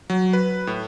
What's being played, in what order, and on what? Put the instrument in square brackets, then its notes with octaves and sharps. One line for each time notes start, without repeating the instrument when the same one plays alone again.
[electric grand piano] F#3
B4
A2